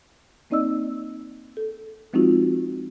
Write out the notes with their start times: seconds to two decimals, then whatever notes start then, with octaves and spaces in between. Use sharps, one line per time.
0.50 A#3 C4 D#4 D5 D#5 E6
1.57 A4
2.13 F3 G#3 C4 D#4 F4 F#4